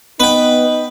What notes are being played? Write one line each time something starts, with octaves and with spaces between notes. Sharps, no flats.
B3 D#4 B4 G5